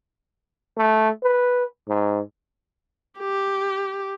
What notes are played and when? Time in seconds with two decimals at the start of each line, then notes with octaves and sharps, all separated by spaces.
0.77 A3
1.23 B4
1.88 G#2
3.19 G4